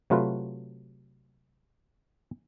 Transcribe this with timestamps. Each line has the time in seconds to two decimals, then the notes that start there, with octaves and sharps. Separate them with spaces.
0.10 C3 F#3 A3 F4 B4